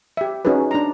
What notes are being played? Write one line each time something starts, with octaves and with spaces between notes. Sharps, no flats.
G4 E5
C#4 D#4 F#4 G#4 B4
D4 A#5